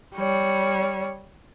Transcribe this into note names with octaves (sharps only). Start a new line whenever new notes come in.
G3 C#5